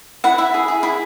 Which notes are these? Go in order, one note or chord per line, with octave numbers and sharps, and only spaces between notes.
E4 F#5
E4 E5
G#4
G#4
E4